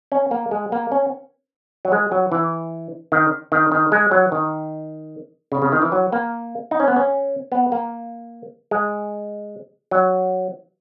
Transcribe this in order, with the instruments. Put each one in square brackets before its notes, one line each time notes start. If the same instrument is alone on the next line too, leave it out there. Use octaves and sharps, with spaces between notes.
[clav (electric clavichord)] C#4
A#3
G#3
A#3
C#4
F#3
G#3
F#3
E3
D#3
D#3
D#3
G#3
F#3
D#3
C#3
C#3
D#3
E3
F#3
A#3
D#4
C#4
B3
C#4
B3
A#3
G#3
F#3